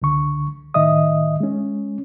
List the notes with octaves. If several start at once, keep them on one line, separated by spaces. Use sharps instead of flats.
C#2 D3 C#6
A2 D#3 D#5 E5 D#6
G#3 C#4